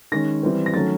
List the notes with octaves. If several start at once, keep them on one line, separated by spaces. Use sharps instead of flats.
D#3 G#3 C#4 A#6
E3 G3 C4
A#6
D#3 F#3 A3 C#4 A6